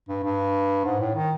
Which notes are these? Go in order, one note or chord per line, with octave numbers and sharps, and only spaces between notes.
G2
G2
G#2
A2
D#3